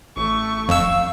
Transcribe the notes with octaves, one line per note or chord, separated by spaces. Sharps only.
A1 A3 C#6
D#1 F2 F5 E6